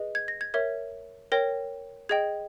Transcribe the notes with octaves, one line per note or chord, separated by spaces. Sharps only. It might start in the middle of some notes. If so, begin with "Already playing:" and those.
Already playing: G#4 B4 D#5
G#6
A#6
G#6
A#4 C#5 E5 G#6
A#4 C#5 G5 A#6
G#4 D#5 G5 G#6